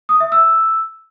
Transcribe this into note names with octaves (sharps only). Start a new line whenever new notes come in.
D#6
E5
E6